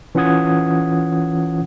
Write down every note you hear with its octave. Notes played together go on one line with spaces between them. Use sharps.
E3 C#4 F4 F#5 D#6 G#6